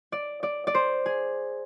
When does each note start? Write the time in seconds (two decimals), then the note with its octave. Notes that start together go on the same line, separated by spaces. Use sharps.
0.12 D5
0.43 D5
0.67 D5
0.74 C5
1.06 G#4